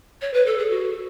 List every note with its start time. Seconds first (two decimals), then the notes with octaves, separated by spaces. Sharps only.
0.21 C#5
0.33 B4
0.46 A4
0.58 G#4
0.70 F#4